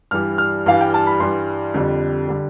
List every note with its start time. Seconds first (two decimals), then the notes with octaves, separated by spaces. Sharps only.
0.11 G2 E3 G3 F6
0.38 F6
0.66 G2 E3 G3 F5
0.81 G5
0.94 A5
1.07 B5
1.20 G2 E3 G3 C6
1.74 F2 D3 G3
2.28 D3 G3